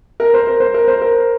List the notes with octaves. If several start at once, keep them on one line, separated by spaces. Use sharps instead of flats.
A#4
C5
A#4
C5
A#4
C5
A#4